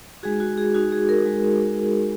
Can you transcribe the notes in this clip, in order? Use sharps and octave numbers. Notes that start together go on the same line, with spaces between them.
G#3 D#4 F#4 G#4
F#4
G#4
G#3 D#4 F#4
G#4
A#4
G#3 D#4 F#4